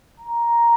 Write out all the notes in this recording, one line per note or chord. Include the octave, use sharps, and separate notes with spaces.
A#5